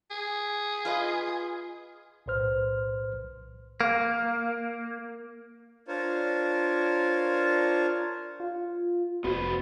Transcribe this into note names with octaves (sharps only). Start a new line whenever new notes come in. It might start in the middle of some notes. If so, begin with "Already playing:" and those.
G#4
F4 B4 D#5
B1 A2 B4 C5 F6
A#3
D4 F4 A#4 C5 C#5
F4
F1 B3 F#4 B4 C5